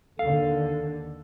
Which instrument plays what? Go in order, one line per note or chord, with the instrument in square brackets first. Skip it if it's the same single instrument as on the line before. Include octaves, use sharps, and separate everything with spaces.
[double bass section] D#2 D3 [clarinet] A4 [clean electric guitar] F5